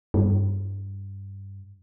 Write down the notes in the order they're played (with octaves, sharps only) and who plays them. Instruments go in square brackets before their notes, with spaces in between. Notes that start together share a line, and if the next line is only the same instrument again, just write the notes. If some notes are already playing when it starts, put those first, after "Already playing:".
[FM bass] G2